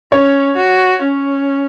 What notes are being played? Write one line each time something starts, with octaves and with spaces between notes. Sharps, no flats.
C#4 C#5
F#4
C#4